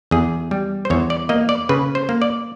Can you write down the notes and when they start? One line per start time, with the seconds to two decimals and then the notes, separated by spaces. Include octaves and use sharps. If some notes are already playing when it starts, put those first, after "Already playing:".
0.11 E2 G#4
0.51 G3
0.85 C5
0.90 E2 C#5
1.10 D5
1.29 A#3 D#5
1.49 D5
1.69 C#3 B4
1.95 C5
2.09 A#3
2.22 D5